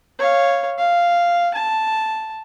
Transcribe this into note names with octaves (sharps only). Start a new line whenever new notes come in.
C#5 F5
F5
A5